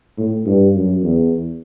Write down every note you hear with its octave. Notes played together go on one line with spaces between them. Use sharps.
A2
G2
F#2
E2